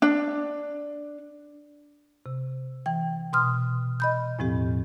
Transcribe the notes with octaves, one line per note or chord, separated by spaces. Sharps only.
D4
C3
E3 G5
B2 C6 D#6 F6
D#5 B5 G6
E2 A2 F3 C4 G4